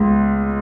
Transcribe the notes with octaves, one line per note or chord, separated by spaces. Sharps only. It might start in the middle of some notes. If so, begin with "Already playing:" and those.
Already playing: C#2 G#3 B3